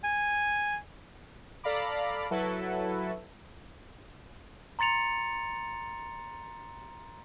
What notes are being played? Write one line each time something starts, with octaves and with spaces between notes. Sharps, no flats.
G#5
A4 D5 F5 A#5 B5 D6
F#3 E4 F#4 A4 B4
A#5 C6 A6 C#7 F7